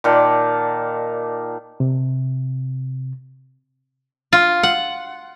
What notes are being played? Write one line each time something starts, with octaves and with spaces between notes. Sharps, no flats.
A#2 D#3 D5 A5
C3
F4
F#5